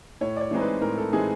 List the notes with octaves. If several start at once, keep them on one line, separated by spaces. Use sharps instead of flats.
A2 C#5
D5
C#5
E3 G#3 C4 D#4
B4
A2 A#4
A4
E3 G#3 C4 D#4 G#4